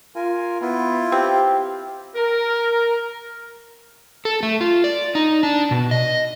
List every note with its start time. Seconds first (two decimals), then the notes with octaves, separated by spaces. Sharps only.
0.15 F4 A#4 G#5
0.61 B3 E4 F4
1.12 C4 G4
2.15 A#4
4.25 A4
4.43 A3
4.61 F4
4.84 D5
5.15 D#4
5.43 D4
5.71 B2
5.91 D#5